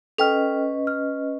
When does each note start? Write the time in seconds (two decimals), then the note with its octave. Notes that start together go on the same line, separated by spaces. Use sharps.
0.18 C#4 A4 B4 D#5 G5 F6
0.87 F6